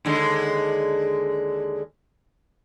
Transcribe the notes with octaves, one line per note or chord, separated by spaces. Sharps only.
D#2 D3 G#3